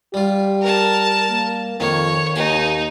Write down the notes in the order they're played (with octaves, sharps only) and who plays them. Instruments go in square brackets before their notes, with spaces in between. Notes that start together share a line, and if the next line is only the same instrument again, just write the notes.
[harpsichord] G3 F4 [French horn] G4
[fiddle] A#4 A5
[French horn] A#3
[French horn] F2 [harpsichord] D#3 A#3 [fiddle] C#5
[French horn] D#2 [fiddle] D#4 [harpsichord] G#5